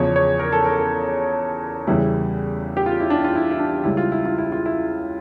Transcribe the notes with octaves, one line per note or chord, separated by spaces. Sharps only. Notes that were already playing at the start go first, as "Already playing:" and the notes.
Already playing: E2 C#3 F3 C#5
C#5
A#4
A4
A#4
A4
E2 C#3 E3 G3 E4
G4
F4
E4
D4
F4
E4
E4
D4
C#2 C#3 G3 E4
F4
E4
F4
E4
F4
E4